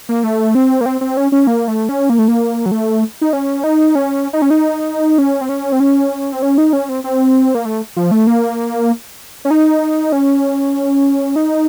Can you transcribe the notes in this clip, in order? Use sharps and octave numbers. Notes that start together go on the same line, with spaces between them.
A#3
A3
C4
A#3
C4
C4
C#4
C#4
A#3
A3
C#4
A#3
A3
A#3
F#3
A3
D#4
C#4
D#4
C#4
D#4
C#4
D#4
C#4
C4
C#4
C4
C#4
C4
C#4
D#4
C#4
C4
C4
A#3
A3
F3
A3
A#3
C#4
D#4
C#4
D#4